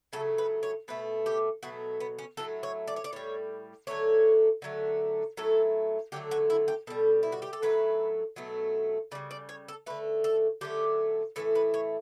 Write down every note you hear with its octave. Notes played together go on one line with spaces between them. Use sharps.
C#3 F#3 A3 A4
B4
C#5
B2 A3 B4
G4
B2 F#3 A3 F#4
B3
C#4
A2 F#3 A3 A4
C#5
D5
C#5
D5
A2 G3 C#5
D3 F#3 A3 C#5
D3 F#3 A3
A2 F#3 A3 A4
D3 F#3 A3 G4
F#4
E4
G4
B2 G3 A4
E4
F#4
G4
A4
A2 F#3 A3 B4
B2 F#3 A3
C#3 G3 D5
D5
C#5
A4
D3 A3 B4
A4
D3 F#3 A3 G4
A2 E3 A3 A4
B4
C#5